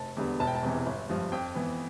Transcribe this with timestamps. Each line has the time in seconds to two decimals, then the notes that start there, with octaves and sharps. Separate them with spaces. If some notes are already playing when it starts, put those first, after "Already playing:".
Already playing: F1 A5
0.17 E2 D3 G3 B3
0.40 E1 A5
0.47 G5
0.55 A5
0.63 E2 C3 E3
0.86 G1
1.09 G2 F3
1.32 F2 G5
1.55 E3 B3